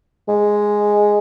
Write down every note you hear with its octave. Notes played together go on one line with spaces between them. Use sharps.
G#3